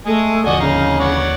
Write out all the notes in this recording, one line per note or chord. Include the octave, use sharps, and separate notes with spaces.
G#3 A3 G#4
D#2 D3 F3 F#4 D5 D#5 G#5
C#3 D#4 F5
C#5 D5 F#5